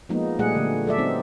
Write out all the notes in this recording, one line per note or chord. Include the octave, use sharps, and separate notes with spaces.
F3 G#3 A#3 B3 D#4
A#2 G3 A3 G#4 F#5
D3 A3
F#3 A4 D5 E5
B3 C4 D#4